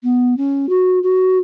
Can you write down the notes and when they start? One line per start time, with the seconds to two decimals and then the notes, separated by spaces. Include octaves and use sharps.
0.03 B3
0.37 C#4
0.69 F#4
1.03 F#4